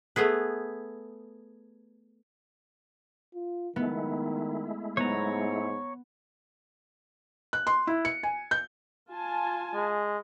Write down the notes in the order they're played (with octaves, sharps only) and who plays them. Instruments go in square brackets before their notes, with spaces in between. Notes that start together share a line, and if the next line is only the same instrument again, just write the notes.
[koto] A3 B3 G#4 B4
[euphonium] F4
[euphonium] D#3 [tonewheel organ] G#3 A3 E4 [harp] B3
[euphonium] G#2 [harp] B3 [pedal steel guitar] C#5 A#5
[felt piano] F#6
C6
E4
C#7
G#5
G6
[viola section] F4 G#5 A5
[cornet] G#3